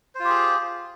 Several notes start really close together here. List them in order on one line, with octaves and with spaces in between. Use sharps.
C5 F4 G4 G#4